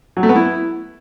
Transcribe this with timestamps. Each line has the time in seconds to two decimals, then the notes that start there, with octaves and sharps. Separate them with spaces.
0.17 F#3
0.23 A3
0.29 B3
0.36 E4